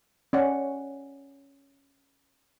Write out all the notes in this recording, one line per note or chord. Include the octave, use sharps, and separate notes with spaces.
C#4 D5 F#5